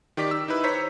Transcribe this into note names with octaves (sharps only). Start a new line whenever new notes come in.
D#3 D#4 G4 D5 D6 B6
E6
D#4 E4 B4
C5 C#5 A#5 B6